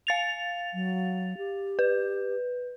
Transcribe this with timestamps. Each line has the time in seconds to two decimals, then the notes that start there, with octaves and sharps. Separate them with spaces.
0.07 F5 A6 F7
0.74 F#3
1.38 G4
1.79 B4